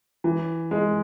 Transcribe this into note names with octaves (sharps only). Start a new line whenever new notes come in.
E3
G#3